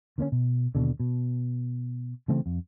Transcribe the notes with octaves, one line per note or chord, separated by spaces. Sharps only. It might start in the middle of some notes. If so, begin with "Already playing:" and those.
D3 A#3 C4 C#4
B2
D#2 B2 D3
B2
C#3 E3 A3 C4
F2